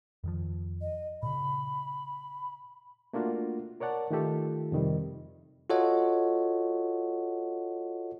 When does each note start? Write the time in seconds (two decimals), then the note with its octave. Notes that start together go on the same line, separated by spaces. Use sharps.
0.24 F2 D#3 F3
0.81 D#5
1.23 A#2 C#3 B5
3.13 A3 A#3 D4 F4 F#4
3.80 A#4 C#5 D5 F#5 A5
4.11 D#3 A3 F4 G4 A4
4.72 F2 C3 D#3 G3
5.70 F4 F#4 A4 C#5 D#5 F#5